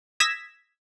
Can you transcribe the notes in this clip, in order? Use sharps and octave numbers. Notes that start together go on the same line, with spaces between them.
D#6 E6 G#6 A#6 B6 E7